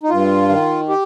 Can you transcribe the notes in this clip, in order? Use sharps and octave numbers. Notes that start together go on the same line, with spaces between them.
D#4
G2 F4
D#3
G4